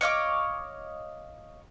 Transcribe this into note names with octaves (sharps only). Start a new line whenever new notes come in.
C#5 D#5 F5 D6